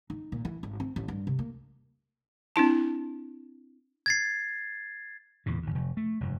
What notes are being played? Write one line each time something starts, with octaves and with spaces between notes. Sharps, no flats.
D#4
A#2
E3
G#1
C4
A1
G2
C3
A#3
C4 D4 E4 A5
G#6 A6 C7
E2 A#2 C#3
G#1 D#2
F1
A3
F1 G2